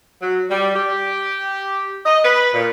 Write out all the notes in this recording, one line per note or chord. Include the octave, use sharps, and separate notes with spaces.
F#3
G3
G4
D#5
B4
A#2